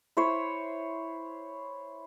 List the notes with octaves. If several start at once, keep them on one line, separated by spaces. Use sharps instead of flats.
E4 C5 C#5